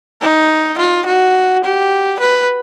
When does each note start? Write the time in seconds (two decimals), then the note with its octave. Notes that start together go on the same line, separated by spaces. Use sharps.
0.21 D#4
0.78 F4
1.06 F#4
1.64 G4
2.20 B4